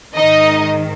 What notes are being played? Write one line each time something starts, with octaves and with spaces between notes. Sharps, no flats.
G#2 D#3 D#4 D#5